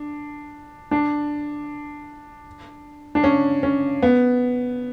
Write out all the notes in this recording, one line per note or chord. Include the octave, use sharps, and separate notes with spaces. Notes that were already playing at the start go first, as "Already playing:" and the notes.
Already playing: D4
D4
D4
C#4
C#4
B3